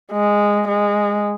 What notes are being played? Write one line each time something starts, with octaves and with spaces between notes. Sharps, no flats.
G#3
G#3